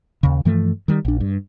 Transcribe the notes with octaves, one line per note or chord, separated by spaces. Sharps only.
D#2 C#3
G2 E3 F3 A3
D#3 G3
A#1 D4
G2